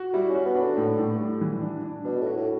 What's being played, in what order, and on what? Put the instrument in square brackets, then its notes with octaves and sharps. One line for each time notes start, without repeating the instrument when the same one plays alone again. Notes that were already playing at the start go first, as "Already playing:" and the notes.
Already playing: [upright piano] F#4
[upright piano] G3 [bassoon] E4
[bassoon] C#4
[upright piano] F#4
[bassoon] B3
[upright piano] D4
[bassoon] D3
[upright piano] A2
A2
G3
E3
D4
D4
[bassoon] B2 [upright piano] D4
[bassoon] A2
[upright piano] F#4
[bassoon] A2